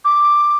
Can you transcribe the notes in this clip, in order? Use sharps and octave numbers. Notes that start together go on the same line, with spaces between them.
D6